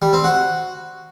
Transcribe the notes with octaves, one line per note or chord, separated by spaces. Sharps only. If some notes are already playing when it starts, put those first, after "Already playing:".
G3
C4
F#4